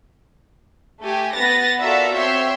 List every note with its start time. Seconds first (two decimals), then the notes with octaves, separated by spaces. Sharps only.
1.02 A3 G4 G#5
1.34 B3 B4 A6 A#6
1.81 F4 F#4 A4 A#4 D5 E5
2.13 C4 C#5 E5 G5 C6